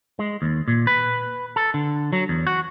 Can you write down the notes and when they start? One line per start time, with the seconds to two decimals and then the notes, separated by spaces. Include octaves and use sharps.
0.19 G#3
0.42 D#2
0.68 A#2
0.87 B4
1.56 A4
1.74 D3
2.13 F#3
2.29 E2
2.47 F#4